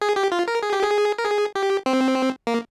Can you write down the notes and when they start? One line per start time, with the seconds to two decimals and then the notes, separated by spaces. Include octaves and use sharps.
0.01 G#4
0.16 G4
0.32 F4
0.48 A#4
0.63 G#4
0.73 G4
0.83 G#4
1.18 A#4
1.24 G#4
1.55 G4
1.86 C4
2.47 A#3